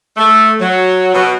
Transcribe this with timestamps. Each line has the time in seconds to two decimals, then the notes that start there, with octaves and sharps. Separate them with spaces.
0.17 A3
0.59 F#3
1.14 B2